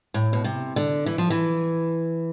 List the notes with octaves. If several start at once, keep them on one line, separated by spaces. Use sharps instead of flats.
A2
B2
C3
D3
E3
F3
E3